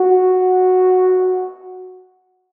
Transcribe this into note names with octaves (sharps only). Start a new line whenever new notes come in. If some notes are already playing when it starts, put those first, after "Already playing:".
Already playing: F#4